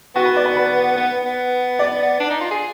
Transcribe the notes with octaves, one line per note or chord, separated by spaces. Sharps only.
B3 F#4
B4
D5
B4
B4
B3
B3
D5
D4
D#4
F4
G#4